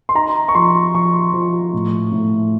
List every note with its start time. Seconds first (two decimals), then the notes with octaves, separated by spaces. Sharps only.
0.09 C6
0.15 D#4 A#5
0.49 C#6
0.55 F3 C6
0.94 F3 C#6
1.33 F3
1.73 A2
2.12 A2